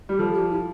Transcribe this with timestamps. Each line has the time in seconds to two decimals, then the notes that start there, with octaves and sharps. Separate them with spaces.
0.09 G3 G4
0.19 F3 A4
0.34 G4
0.50 E4